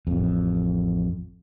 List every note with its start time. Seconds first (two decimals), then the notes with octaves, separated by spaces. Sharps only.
0.07 A1 F2